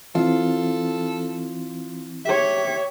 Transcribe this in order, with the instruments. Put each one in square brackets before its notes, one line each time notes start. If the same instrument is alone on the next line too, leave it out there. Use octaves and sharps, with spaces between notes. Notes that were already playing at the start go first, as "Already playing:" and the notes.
[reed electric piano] E3 C4 E4 [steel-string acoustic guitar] F4 [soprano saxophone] A4
[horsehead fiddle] G4 C#5 [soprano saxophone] E5